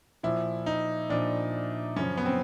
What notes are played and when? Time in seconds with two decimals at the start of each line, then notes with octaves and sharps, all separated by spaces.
0.23 A#2 F3 E4
0.66 D#4
1.10 A#2 F3 D4
1.96 F#2 C#3 F3 C#4
2.17 B3
2.26 C4